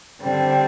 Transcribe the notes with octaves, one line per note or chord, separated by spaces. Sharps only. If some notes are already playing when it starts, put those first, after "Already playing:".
D3 G3 C4